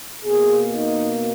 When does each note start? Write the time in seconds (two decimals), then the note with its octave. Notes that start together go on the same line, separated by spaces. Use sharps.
0.24 B2 A#3 G#4
0.73 D#4